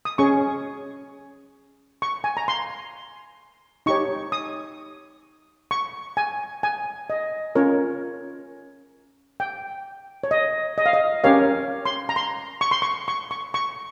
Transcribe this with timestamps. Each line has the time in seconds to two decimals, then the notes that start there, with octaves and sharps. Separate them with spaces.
0.05 D#6
0.18 C#4 G#4 C#5 C#6
2.02 C#6
2.24 G#5
2.37 A#5
2.48 C6
3.86 D#4 G4 C#5 C#6
4.32 D#6
5.71 C#6
6.17 G#5
6.63 G#5
7.10 D#5
7.55 C#4 F4 A#4 C#5
9.40 G5
10.24 C#5
10.31 D#5
10.78 D#5
10.86 F5
10.93 D#5
11.24 C#4 G4 A#4 C#5 F5
11.85 C6
12.09 A#5
12.16 C6
12.61 C#6
12.71 C6
12.82 C#6
13.08 C#6
13.31 C#6
13.54 C#6